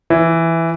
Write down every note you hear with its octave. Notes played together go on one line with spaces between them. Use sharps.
E3